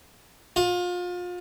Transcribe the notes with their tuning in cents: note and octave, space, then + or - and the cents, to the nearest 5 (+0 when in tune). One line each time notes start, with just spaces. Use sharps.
F4 +30